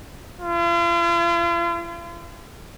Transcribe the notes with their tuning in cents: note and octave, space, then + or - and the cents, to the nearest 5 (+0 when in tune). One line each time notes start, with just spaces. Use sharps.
F4 -40